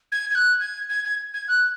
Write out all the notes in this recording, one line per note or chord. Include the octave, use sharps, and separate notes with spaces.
G#6
G#6
F#6
G#6
G#6
G#6
G#6
F#6